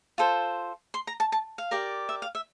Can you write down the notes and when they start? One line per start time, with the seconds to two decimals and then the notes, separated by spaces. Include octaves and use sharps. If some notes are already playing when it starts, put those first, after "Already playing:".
0.18 F4 A4 C5
0.94 C6
1.07 A#5
1.20 A5
1.32 A5
1.58 F5
1.71 G4 A#4 D5
2.09 E5
2.22 F5
2.35 E5